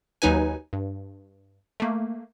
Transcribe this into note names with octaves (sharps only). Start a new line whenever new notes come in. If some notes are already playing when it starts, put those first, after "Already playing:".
D#2 F#3 D#4 B4 G#5
G2
A3 A#3